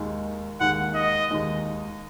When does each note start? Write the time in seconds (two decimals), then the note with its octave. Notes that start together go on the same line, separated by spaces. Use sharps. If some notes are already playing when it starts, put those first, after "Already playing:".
Already playing: D#2 D#3 G#3 D#4
0.61 D#2 D#3 G#3 D#4 F#5
0.95 D#5
1.31 D#2 D#3 G#3 D#4